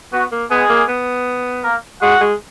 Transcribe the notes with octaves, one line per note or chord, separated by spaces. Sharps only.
B3 F#4
A#3
G#3 B3 G#4
A#3
B3
A#3 A#4
G#3 F#4 F#5
G#3